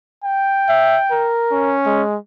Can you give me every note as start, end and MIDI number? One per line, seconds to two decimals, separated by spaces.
0.24 1.33 79
0.69 1.00 76
1.11 1.77 70
1.51 2.02 61
1.86 2.17 56